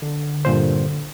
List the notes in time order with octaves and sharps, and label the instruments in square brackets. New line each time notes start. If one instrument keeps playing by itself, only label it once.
[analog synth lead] D3
[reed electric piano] G2 A#2 C5